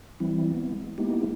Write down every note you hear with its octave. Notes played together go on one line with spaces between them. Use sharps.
E3 G3 C4 E4
B3
G#3
G#3 A#3 B3 D#4 E4 G4